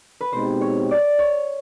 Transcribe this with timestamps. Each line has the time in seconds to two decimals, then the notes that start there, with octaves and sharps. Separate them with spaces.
0.21 B4
0.33 B2 G#3 C4 D#4 G4 C5
0.61 C#5
0.91 D5
1.19 C#5